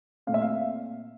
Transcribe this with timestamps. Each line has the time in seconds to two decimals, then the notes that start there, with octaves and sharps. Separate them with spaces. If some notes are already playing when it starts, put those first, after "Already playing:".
0.27 A#2 A3 C4 F5
0.34 E5
0.41 F5